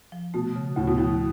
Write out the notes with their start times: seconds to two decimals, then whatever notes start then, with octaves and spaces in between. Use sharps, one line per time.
0.12 F3
0.34 B2 A3
0.56 C#3
0.76 D2 A2
0.87 B2
0.98 A2 F3